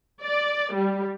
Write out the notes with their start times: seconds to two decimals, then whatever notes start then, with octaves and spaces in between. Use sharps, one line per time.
0.22 D5
0.74 G3